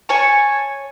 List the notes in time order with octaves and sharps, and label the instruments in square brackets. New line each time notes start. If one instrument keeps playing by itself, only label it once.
[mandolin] C#5 G#5 A5 C#6